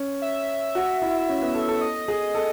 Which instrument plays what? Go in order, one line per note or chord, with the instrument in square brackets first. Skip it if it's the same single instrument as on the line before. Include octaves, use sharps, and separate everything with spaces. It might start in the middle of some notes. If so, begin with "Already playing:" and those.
Already playing: [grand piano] C#4
[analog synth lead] E5
[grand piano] F#4
E4
C#4
B3
A4
A4
[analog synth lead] D#5
[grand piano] G#4
A4